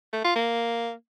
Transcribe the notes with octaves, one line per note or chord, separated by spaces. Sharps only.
A3
F4
A#3